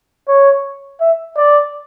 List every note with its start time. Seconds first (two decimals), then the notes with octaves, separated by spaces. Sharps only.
0.28 C#5
1.01 E5
1.37 D5